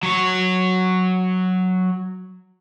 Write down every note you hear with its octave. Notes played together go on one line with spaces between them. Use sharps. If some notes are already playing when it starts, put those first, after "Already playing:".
F#3 C#5